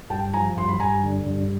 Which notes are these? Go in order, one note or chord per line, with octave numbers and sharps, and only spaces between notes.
G2 G5 A5
F3 G#5 A#5
G2 C6
B5
G2 G#5 A#5
D3
G2